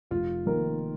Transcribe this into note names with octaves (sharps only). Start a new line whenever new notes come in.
F1 F4
F2 D#3 A#3 A#4